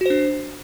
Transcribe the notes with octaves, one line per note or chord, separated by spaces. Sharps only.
D4 F#4 C5